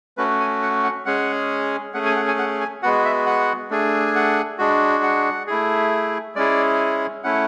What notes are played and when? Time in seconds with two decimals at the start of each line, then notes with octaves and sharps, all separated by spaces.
0.17 A3 C#4 F#4 B4
0.40 G#5
0.62 F#5
0.84 F#5
1.05 G#3 C#4 G#4 F#5
1.94 A3 C#4 G#4 F#5
2.06 G#5
2.16 F#5
2.28 G#5
2.39 F#5
2.61 G#5
2.83 G#3 B3 F#4 F#5
3.05 E5
3.26 F#5
3.71 A3 D4 G#4
4.07 G#5
4.15 F#5
4.59 G#3 D4 F#4
5.03 F#5
5.47 A3 E4 G#4
6.35 G#3 C#4 E4 G#4 D5
7.24 A3 C#4 E4 F#5